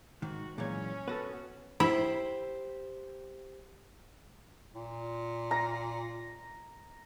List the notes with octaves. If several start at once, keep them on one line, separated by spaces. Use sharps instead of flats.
G#2 D#3 F#4
A#2 E3 F#3 G#3 C#4 G#6
B3 F#4 A4 B4
E4 G4 C5
A#2
A#5